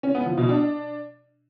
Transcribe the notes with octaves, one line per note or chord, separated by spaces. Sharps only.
C#4
B3
F3
B2
D4